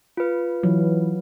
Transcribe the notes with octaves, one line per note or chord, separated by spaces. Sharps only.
F4 B4
E3 F#3